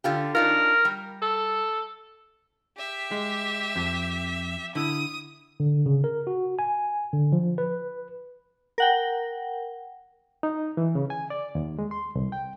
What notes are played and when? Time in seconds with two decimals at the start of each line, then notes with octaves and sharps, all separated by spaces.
0.04 D3 F4 G4
0.35 D4 D#4 F4 A#4
0.85 G3
1.22 A4
2.77 G4 E5
3.11 G#3
3.76 F2
4.75 D3 E4 D#6
5.60 D3
5.86 C#3
6.04 A#4
6.27 F#4
6.59 G#5
7.13 D3
7.32 F3
7.58 B4
8.78 A#4 F#5 G5
10.43 D#4
10.77 E3
10.95 C#3
11.10 G#5
11.30 D5
11.55 D#2
11.79 G#3
11.91 C6
12.15 C2
12.32 G5